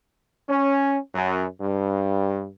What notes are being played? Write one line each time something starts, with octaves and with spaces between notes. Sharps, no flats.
C#4
F#2
G2